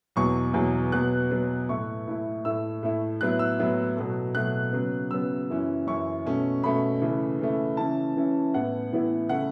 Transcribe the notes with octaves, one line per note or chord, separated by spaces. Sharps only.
E2 B2 F#3 C#6
E2 B2 F#3
B2 F#3 B3 F#6
B2 F#3 B3
A2 A3 E4 C#6
A2 A3 E4
A2 A3 E4 E6
A2 A3 E4
A2 F#3 B3 E4 F#6
E6
A2 F#3 B3 E4
B2 F#3 A3
B2 F#3 A3 F#6
C#3 F#3 B3
C#3 F#3 B3 E6
F#2 E3 C#4 E4
F#2 E3 C#4 E4 C#6
B2 A3 C#4
B2 A3 C#4 B5
C#3 E3 A3
C#3 E3 A3
C#3 E3 C#4 E4 A5
C#3 E3 C#4 E4
A2 E3 B3 E4 F#5
A2 E3 B3 E4
C#3 A3 E4 F#5